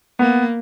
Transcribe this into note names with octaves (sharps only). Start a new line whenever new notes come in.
A#3 B3